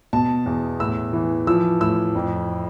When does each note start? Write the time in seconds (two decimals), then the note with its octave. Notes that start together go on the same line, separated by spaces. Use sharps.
0.13 B2 A5
0.46 E2
0.80 A2 E6
1.13 E3
1.47 F3 E6
1.81 A2 E6
2.15 F2